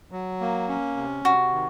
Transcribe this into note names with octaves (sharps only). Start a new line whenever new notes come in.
F#3
A#3
C#4
C3
C3 F#4
D#3